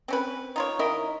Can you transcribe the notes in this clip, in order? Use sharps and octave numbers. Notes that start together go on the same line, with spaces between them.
C4 C#4 B4
D#4 F4 C#5
D#3 E4 A#4 D#5